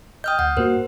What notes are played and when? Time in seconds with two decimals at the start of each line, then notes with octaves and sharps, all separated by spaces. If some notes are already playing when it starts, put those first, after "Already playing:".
0.24 D#5 G5 D#6 F6 G6
0.39 D2 F#5 G6
0.57 G2 A#3 F#4 A#4 C5